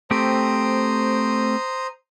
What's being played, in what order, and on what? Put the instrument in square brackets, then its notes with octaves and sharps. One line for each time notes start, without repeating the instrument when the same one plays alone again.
[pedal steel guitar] A3 C4 G4 [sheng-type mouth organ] C5 A#5 D#6